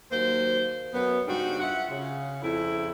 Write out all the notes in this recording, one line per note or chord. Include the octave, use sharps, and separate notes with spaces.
D#2 F#3 A#3 C5
F#2 B3
G#2 C#3 G3 D4 F#4
F4 E5 F#5
C#3
F2 C#3 E4